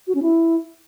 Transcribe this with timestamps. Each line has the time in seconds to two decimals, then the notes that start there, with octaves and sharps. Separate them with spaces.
0.07 F#4
0.15 C#4
0.22 E4